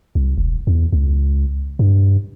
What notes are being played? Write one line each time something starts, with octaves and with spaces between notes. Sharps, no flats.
C2
E1
E2
C#2
G2